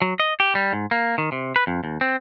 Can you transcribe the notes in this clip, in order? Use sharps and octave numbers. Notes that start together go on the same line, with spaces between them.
F#3
D#5
G4
G3
G#2
A#3
D#3
C3
B4
F2
D#2
C4